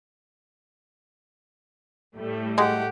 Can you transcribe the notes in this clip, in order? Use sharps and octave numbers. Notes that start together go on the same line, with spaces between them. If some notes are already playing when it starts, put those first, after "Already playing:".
A2 G3 A3
G#3 G4 F#5